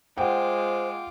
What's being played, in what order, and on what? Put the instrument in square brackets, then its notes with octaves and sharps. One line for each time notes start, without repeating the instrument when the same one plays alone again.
[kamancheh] G#3 [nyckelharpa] F4 D6 [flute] C5 [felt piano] F#5 G5